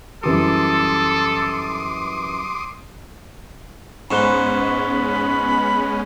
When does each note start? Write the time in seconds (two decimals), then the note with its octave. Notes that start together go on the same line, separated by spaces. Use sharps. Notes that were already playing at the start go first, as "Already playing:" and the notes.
0.23 F#2 E3 G3 A4 C6 D6 D#6
4.11 G#2 G#3 B3 C#4 B5 C#6 F#6 G7